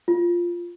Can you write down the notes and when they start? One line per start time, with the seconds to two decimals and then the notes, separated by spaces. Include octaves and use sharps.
0.08 F4